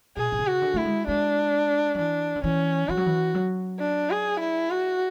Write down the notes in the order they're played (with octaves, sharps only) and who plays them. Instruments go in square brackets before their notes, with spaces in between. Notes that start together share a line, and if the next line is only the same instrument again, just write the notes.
[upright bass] B2 [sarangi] G#4
[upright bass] B2
C#3
[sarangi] F#4
[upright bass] D3
[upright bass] A3 [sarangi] E4
[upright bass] G#3
[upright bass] G#3 [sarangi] D4
[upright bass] F#3
[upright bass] E3 [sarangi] D4
[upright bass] D3
[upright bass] E3 [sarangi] C#4
[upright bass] E3 [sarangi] F#4
[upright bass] F#3
E3
F#3
[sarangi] D4
G#4
E4
F#4